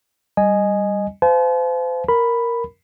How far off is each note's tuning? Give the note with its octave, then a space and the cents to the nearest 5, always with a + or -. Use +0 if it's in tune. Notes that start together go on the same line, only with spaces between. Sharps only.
G3 +0 D#5 -10 G#5 +5
C5 -40 F5 -20 A5 -45
A#4 +0 B5 +0